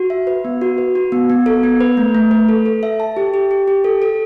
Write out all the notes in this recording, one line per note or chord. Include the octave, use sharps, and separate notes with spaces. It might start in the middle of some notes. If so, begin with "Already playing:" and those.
Already playing: F#4
E5
B4
B3
F#4
B4
F#4
B3
B3
A4
B3
B4
A3
A3
B4
A4
A4
E5
A5
G4
G4
G4
G4
A4
A4